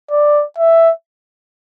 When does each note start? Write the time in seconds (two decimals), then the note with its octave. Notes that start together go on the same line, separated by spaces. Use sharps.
0.11 D5
0.58 E5